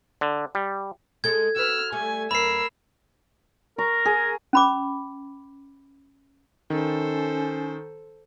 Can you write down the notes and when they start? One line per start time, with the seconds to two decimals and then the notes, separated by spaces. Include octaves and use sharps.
0.21 D3
0.55 G3
1.24 G#3 A4 G#6
1.56 F#4 B4 E6 F6
1.92 G3 A3 G#5
2.31 F#2 A#4 B5 E6 C7
3.78 A#4 A#5 C#6
4.05 G#4
4.53 C#4 B5 D6
6.70 D#3 C#4 A4 C5